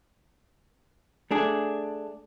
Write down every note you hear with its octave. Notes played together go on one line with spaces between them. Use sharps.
A3 D4 G#4